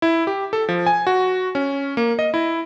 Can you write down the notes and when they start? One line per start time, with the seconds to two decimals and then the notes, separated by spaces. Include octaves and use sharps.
0.02 E4
0.27 G4
0.53 A4
0.69 F3
0.86 G#5
1.07 F#4
1.55 C#4
1.97 A#3
2.19 D#5
2.34 E4